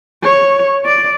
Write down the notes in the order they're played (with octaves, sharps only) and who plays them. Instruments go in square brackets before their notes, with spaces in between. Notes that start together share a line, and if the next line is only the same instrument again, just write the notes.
[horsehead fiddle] C#5
D5